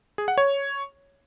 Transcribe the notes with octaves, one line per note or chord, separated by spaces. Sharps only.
G#4
F#5
C#5